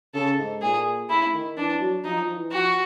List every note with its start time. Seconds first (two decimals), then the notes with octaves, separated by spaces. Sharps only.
0.14 C#3 A4
0.38 G#2
0.62 A#2 G#4
1.09 A2 E4
1.33 D#3
1.57 E3 D4
1.80 F#3
2.04 F3 D#4
2.20 F3
2.36 E3
2.52 F3 F#4